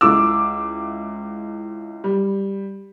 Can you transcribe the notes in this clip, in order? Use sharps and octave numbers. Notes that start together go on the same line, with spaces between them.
C#2 E4 D6 E6
G3